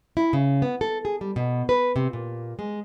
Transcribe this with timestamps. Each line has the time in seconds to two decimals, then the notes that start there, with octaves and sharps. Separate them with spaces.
0.17 E4
0.33 C#3
0.62 B3
0.81 A4
1.05 G#4
1.21 G3
1.36 B2
1.69 B4
1.96 C3
2.13 A#2
2.59 G#3